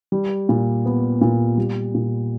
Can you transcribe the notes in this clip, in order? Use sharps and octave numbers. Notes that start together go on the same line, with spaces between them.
G3
A#2
B3
A#2
G3
A#2